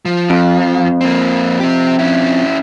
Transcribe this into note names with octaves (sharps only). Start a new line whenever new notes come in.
F3
F2
A#3 C4
C4 G4
C#4 E4